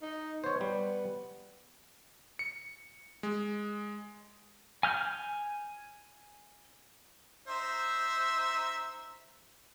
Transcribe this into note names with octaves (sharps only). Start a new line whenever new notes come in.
D#4
B3 C5 C#5
G3
C#7
G#3
G#5 F6 G6
D#4 C5 E5